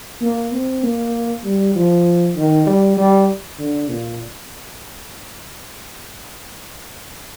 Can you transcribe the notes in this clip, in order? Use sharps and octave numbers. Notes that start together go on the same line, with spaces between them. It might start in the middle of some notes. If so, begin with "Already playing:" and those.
A#3
C4
A#3
G3
F3
D#3
G3
G3
D3
A#2